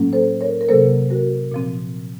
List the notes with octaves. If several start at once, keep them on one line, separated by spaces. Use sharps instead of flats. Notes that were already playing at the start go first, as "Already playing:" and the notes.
Already playing: A2 F#3 A#3 C#4
A4 C5
A#4 C#5
A#4
C3 F#3 A#3 A4 C5
F#4 A#4
A#2 F3 C4